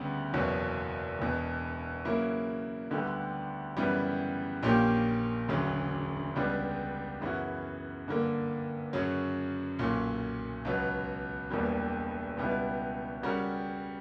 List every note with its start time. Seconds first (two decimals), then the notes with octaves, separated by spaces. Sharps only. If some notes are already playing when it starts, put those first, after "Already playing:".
Already playing: D2 C#3 G3 B3
0.33 F#1 E2 B2 F#3 C#4
1.19 E1 E2 B2
2.05 C#3 F#3 A#3 E4
2.91 D2 D3 G3 B3
3.77 F#2 C#3 E3 G3 B3
4.63 A#1 A#2 A#3 C#4 G4
5.48 E1 D2 C#3 F#3
6.36 C#2 C#3 G3 B3 D4
7.21 F#2 C#3 E3 B3 F#4
8.08 G2 D3 A#3
8.93 F#2 C#3 F#3 C#4
9.79 B1 A#2 F#3 C#4
10.65 C#2 B2 F#3 B3
11.50 E1 E2 B2 G3 A#3
12.37 C#2 B2 G3 B3 E4
13.23 C#3 G3 C#4 F#4 A#4